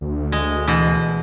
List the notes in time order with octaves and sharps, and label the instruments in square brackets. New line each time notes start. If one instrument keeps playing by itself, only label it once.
[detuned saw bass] D2
[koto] G#3
B2 E3